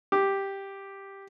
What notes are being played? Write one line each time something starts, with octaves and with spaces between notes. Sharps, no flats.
G4